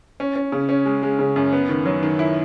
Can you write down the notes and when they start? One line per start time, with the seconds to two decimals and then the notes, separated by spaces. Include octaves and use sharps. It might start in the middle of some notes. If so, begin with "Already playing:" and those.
0.20 C#4
0.36 C#4
0.52 C#3
0.69 C#4
0.86 G#3
1.03 G#3
1.19 C#3
1.36 F#2
1.53 B3
1.69 D#3
1.86 F#3
2.03 D#3
2.19 E4